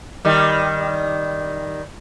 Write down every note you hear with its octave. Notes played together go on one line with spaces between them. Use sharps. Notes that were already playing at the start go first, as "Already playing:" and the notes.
D#3 G3